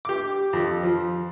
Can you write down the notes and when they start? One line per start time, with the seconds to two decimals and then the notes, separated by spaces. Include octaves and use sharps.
0.05 G4 D6
0.53 F2
0.83 F3